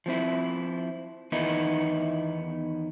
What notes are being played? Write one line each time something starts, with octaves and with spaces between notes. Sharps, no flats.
F3 C4 E4
E2 D#3 B3 D#4 E4